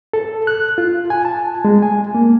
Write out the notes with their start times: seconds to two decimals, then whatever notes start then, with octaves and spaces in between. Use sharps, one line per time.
0.14 A4
0.47 F#6
0.78 F4
1.10 G#5
1.25 A5
1.65 G#3
1.82 G#5
2.15 A#3